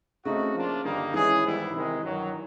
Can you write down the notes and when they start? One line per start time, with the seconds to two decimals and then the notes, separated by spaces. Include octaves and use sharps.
0.25 C#3 A3 C4 D#4 F#4
0.54 F3 A#3 D4 F4
0.84 G2 D3 D#3 G3 A#3 D#4
1.14 E3 G#3 C#4 E4 G#4
1.44 G#2 D#3 G3 B3 E4
1.74 C3 D#3 G#3
2.03 G2 D#3 F#3